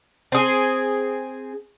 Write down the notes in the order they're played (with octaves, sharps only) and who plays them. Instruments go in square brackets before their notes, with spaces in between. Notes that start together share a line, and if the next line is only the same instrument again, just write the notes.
[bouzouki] C4 G#4